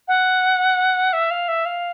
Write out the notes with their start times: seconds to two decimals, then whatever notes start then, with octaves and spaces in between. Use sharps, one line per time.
0.08 F#5
1.13 E5
1.31 F5
1.48 E5
1.66 F5